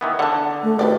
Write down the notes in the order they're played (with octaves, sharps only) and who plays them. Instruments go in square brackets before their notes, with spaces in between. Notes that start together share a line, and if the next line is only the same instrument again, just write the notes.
[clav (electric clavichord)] D#3 E3 B3
[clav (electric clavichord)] D3 [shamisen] F#5 A5
[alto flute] A3
[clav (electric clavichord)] G#1 [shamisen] E4 G4 D5 [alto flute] B4